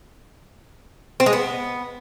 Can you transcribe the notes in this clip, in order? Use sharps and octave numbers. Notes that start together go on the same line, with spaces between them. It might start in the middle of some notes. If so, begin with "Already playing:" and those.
C4
G#3
B3